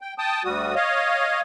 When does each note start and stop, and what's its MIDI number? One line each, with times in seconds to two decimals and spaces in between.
0.01 0.14 79
0.18 0.43 79
0.18 0.43 81
0.18 0.43 87
0.44 0.75 38
0.44 0.75 55
0.44 0.75 66
0.44 0.75 87
0.75 1.41 73
0.75 1.41 75
0.75 1.41 77